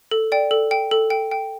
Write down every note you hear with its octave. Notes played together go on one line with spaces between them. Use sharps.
A4
D5 G5
A4
G5
A4
G5
G5